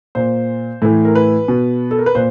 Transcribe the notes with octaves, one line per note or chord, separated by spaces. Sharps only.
A#2 C5
A2 E3
A#4
B4
B2
A4
A#4
B4
A#2 C5